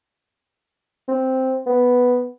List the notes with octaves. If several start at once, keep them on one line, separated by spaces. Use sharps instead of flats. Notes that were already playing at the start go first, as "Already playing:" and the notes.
C4
B3